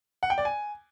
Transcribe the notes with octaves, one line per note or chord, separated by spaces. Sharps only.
F#5
G5
D5
G#5